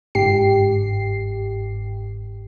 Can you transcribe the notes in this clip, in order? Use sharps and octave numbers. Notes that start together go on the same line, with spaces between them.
G1 G#2 G4 C7